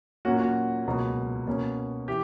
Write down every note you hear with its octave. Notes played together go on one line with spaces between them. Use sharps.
A#2 F#3 A#3 C#4 F#4
F#4
C#2 B2 F#3 A#3
B2 A#3 C#4
E3 G4